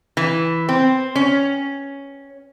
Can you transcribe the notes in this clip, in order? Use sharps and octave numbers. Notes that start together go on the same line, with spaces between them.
E3
C4
C#4